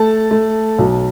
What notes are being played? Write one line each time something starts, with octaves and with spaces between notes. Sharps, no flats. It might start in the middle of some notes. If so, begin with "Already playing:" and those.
Already playing: A3 A5
A3
B1